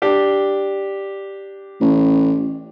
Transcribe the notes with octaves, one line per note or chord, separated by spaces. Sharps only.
D4 G4
A1